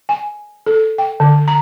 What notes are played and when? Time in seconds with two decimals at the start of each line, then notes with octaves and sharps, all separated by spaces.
0.09 G#5
0.66 A4
0.98 G5
1.20 D3
1.48 A#5